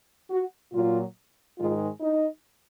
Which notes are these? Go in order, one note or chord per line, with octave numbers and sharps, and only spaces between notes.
F#4
A#2 F#3 F4
G#2 D#3 G#3 F4
D#4